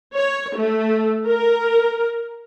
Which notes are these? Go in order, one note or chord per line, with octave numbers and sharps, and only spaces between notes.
C#5
A3
A#4